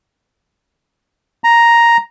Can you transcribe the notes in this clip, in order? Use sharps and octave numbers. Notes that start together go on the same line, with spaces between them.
A#5